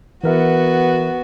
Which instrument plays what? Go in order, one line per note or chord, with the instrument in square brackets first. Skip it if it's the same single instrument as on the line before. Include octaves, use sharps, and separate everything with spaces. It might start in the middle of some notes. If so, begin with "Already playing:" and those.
[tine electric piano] E3 A#4 E5 [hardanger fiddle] B3 F#4